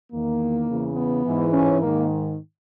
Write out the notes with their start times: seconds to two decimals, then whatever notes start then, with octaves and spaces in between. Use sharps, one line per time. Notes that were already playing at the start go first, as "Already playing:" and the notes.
0.12 E2 D#3 A#3
0.68 E2 C#3 E3
0.96 B3
1.24 G#2 E3
1.53 C#4
1.80 G#2 D#3 A#3